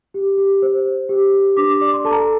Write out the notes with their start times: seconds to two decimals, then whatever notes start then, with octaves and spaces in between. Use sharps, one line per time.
0.14 G4
0.38 G4
0.62 C5
0.85 C5
1.09 G4
1.33 G4
1.57 D4 D6
1.75 D6
1.81 D5
1.93 C6
2.05 A4 A5
2.11 A#5